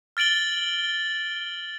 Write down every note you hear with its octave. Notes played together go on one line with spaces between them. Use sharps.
F6 A6 D7 F#7 G7